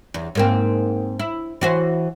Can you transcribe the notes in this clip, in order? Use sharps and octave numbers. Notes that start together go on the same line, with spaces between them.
E2
G#2 A#3 C4
E4
E3 F#4 C5